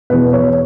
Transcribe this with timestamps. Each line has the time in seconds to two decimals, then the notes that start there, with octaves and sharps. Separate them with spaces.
0.10 E2 B2 B4
0.33 C#5